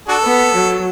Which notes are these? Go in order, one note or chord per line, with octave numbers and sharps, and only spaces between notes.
D4 F#4 A4
B3
F#3